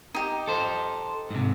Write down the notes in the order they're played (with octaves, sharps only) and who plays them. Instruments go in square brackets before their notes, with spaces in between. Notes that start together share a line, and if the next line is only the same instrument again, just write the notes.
[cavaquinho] D#4 G4
[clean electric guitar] A4 C5
G#2 C3